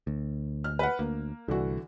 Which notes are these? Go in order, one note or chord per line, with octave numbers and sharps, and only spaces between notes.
D2
F6
B4 F#5
D2 A#3
C2 D3 E3 F#4